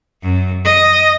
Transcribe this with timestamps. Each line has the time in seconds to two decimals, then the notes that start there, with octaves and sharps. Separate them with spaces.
0.23 F#2
0.65 D#5